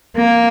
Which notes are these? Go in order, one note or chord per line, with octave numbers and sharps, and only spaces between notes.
A#3